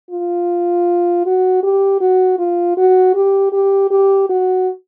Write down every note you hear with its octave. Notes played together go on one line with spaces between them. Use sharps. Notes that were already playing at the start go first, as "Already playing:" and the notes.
F4
F#4
G4
F#4
F4
F#4
G4
G4
G4
F#4